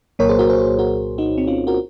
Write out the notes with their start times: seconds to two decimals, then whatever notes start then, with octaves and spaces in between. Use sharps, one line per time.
0.19 C2 A#2 F#3 A#3 A#4 C#5
0.29 G#4 C5
0.39 F#4 A#4
0.49 G#4 C5
0.55 C#5
0.59 G#4 C5
0.79 F#4 A#4
1.18 D#4 F#4
1.38 C4 D#4
1.47 C#4 F4
1.67 F#4 A#4